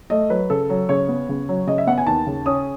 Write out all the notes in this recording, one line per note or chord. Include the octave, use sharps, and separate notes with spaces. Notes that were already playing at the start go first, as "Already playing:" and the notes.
A3 D#5
F#3 B4
C#3 A4
F#3
C#3 C#5
B3
C#3
F#3
C#3 D#5
E5
B3 F#5
G#5
D#2 A5
C#3
C#4 D#6